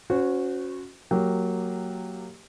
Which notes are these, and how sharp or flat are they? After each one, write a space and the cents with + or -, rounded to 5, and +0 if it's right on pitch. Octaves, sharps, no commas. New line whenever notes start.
C#4 +0 F#4 -15 C5 -40
F#3 +0 A#3 -25 G4 +0